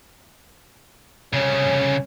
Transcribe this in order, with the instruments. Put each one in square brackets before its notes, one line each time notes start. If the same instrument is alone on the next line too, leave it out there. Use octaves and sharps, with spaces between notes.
[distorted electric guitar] C2 C#3 [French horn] C#4